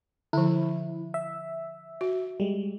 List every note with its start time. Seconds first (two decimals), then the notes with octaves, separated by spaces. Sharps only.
0.33 D3 F3 E4
1.14 E5
2.01 F#4
2.40 G3 G#3